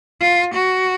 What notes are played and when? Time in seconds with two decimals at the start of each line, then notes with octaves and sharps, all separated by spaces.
0.21 F4
0.54 F#4